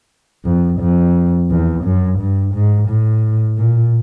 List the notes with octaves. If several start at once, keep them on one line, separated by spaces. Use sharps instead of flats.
F2
F2
E2
F#2
G2
G#2
A2
A#2